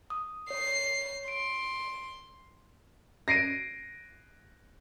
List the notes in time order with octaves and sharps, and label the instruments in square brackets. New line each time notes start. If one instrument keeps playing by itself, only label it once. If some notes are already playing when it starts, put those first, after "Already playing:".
[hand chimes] D#6
[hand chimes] C#5 [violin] C7
[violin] C6 [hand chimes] D7
[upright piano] A#6 C7 D7 D#7